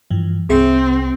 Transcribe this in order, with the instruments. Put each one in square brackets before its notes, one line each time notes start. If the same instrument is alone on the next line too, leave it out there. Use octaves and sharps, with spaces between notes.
[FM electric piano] G2 E3 F3
[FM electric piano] C2 G#4 E5 [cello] C4